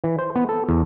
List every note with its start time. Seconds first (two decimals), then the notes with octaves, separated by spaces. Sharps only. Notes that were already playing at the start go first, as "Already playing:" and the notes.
0.04 E3
0.19 C5
0.36 B3
0.49 A4
0.69 E2